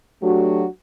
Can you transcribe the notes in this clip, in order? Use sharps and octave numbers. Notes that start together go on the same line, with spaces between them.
F#3 A3 D4 F#4 G4